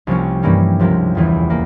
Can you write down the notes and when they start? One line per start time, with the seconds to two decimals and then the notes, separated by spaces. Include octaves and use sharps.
0.07 C2 C3 F3 A#3 C#4
0.43 G2 E3 G3 A#3 C#4
0.79 C#2 C3 F3 A#3
1.15 F1 E2 E3
1.50 A#3